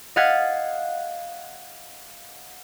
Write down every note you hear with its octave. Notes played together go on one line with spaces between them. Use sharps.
D#5 F5 F#5 G#6 A6 B6